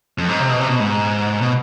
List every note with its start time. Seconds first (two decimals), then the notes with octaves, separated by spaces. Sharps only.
0.18 F2
0.29 G#2
0.40 C3
0.50 B2
0.60 C3
0.69 B2
0.80 G#2
1.41 B2